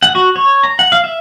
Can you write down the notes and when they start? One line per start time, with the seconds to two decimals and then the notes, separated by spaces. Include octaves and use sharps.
0.03 F#5
0.15 F#4
0.36 C#5
0.63 A#5
0.79 F#5
0.92 F5
1.04 E5